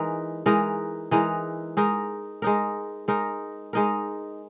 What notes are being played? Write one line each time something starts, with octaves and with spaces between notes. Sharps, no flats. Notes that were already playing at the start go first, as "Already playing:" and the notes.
Already playing: E3 G#3 D#4 A#4
E3 G#3 D#4 A#4
E3 G#3 D#4 A#4
G#3 D#4 A#4
G#3 D#4 A#4
G#3 D#4 A#4
G#3 D#4 A#4